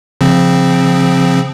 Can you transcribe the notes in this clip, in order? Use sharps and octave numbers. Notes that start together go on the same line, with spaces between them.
C#3 F3 C4